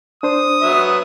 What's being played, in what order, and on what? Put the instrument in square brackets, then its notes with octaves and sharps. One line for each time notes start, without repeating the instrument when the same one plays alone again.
[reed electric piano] D4 C5 [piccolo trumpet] D#6
[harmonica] F#3 B3 E5